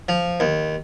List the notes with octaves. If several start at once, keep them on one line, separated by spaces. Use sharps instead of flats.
F3
D#2